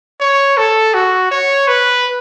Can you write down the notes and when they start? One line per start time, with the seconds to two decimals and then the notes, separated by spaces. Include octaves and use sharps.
0.20 C#5
0.57 A4
0.94 F#4
1.31 C#5
1.68 B4